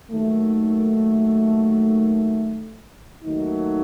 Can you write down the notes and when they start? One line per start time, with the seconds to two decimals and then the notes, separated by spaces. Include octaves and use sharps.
0.11 D#2 D#3 F#3 A3
3.23 D#2 D#3 F#3 A3 D#4